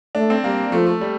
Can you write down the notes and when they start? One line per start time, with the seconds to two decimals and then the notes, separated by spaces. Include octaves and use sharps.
0.15 A3 D4
0.30 C4
0.44 G3 A#3
0.72 F3 A3
0.87 A3
1.01 G3